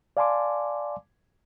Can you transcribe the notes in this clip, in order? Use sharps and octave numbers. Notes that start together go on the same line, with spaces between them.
D5 F5 G#5 A5 C6 D6